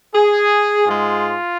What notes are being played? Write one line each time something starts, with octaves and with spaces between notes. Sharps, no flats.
G#4
G#2 G#3 F4